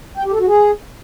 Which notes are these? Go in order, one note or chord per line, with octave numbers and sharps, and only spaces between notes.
G5
G4
A4
F#4
G#4